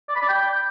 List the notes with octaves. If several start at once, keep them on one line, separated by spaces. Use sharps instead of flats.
D5
B5
D5
G5